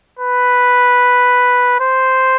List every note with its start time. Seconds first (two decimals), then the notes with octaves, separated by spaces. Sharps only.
0.19 B4
1.80 C5